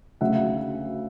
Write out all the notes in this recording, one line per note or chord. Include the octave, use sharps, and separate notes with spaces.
D2 C#3 F#3 E5 F#5